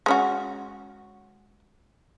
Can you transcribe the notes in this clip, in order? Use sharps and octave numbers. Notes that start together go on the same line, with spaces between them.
G#3 C#4 F#4